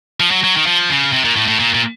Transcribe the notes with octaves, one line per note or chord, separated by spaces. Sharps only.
F3
F#3
F#3
D#3
F3
C#3
C3
A#2
A2
A2
A#2
A#2